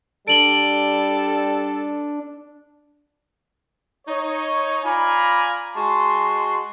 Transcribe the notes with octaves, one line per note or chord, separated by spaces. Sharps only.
G3 D4 A4 D7 F#7 G7
D#4 C#5
F4 D5 F5 G#5 A#5 B5
G#3 F#4 A5 C6